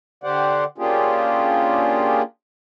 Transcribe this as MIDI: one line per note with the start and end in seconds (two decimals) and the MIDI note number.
0.24 0.64 50
0.24 0.64 67
0.24 0.64 72
0.24 0.64 74
0.24 0.64 78
0.78 2.22 58
0.78 2.22 61
0.78 2.22 62
0.78 2.22 65
0.78 2.22 67
0.78 2.22 68